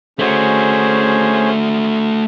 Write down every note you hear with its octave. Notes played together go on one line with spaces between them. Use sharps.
A3 C#4 F#4 G#4 C5